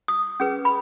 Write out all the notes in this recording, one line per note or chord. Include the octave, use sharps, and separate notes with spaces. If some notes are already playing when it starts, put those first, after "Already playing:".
D#6
C#4 G#4 B4
B5